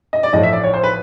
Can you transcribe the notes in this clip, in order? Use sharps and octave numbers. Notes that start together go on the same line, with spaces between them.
D#5
D5
A1 A2 F3 D#5
E5
D5
C#5
C5
B4